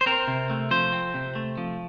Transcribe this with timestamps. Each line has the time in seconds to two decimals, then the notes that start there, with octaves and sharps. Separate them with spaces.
0.01 C5
0.06 C4 A#4
0.27 C3
0.50 A3
0.71 F3 C5
0.93 C4
1.14 C3
1.35 A3
1.58 F3